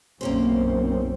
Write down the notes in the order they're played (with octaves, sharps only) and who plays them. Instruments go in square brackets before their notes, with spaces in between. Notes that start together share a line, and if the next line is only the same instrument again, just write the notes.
[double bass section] B1 F#2 C4 [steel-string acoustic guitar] A#3 C#4 C5